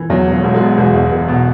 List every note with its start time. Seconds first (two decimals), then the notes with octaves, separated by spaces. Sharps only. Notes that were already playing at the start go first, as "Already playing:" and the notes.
Already playing: E3
0.10 E2 F#3
0.27 E1
0.32 F#3
0.44 E1
0.55 G#3
0.61 B2
0.78 E1
0.94 E2
1.11 E1
1.28 B2